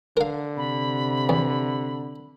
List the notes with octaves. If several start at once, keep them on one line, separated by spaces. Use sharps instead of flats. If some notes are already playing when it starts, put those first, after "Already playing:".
D3 A#4 F5
C3 B5
E2